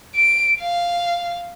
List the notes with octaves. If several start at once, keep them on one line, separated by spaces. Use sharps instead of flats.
D7
F5